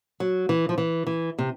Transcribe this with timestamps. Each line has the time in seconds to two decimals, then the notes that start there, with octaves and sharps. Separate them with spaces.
0.20 F#3
0.49 E3
0.69 F3
0.78 E3
1.07 E3
1.38 C3